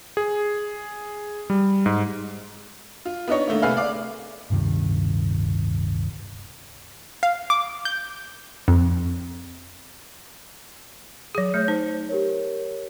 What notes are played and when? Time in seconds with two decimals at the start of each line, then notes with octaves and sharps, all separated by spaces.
0.17 G#4
1.50 G3
1.86 G#2
3.05 F4
3.28 B3 D4 D#4 C#5
3.48 D3 A3 A#3
3.62 C2 A3 G#4 B4 F5 F6
3.77 D5 F5 D6
4.50 D1 G2 C3 D#3
7.23 F5
7.50 D6
7.85 G6
8.68 F2
11.35 F#3 G#4
11.54 A3 C#5 G6
11.68 D#4 C5
12.09 G4 A#4 C#5